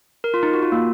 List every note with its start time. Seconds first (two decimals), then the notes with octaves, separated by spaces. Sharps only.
0.24 A#4
0.34 F4
0.43 D#4
0.54 F#4
0.63 F4
0.72 A#3